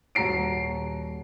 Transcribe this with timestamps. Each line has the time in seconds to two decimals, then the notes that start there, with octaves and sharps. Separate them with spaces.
0.15 D#1 F#4 A#5 C7 D7